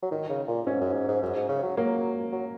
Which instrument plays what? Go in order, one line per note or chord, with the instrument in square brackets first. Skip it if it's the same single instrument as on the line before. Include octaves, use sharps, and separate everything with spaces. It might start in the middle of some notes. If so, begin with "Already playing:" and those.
[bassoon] F#3
[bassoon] D#3 [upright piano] D#4
[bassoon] C#3
A#2
[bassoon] G#2 [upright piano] C#4
[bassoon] F#2
G#2
G#2
F#2
G#2
C#3
F#3
[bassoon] F#3 [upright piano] A#3
[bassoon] F#3